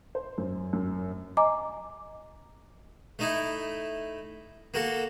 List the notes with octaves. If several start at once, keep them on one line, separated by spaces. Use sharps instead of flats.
C5
F#2
F#2
D#5 G#5 A#5 D6
A3 D#4 E4
A#3 F#4 A4